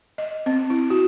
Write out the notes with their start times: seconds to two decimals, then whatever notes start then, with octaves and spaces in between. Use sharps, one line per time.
0.18 D#5
0.46 C4
0.70 E4
0.90 F#4